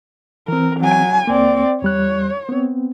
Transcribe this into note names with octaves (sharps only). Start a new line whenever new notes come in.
E3 C4 A#4
F#3 G#5
C#2 A#3 C4 D5
E2 G3 C#5 F#6
B3 C4